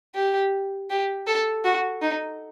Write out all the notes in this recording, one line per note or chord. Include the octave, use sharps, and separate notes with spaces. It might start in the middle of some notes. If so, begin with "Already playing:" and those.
G4
G4
A4
F#4
D#4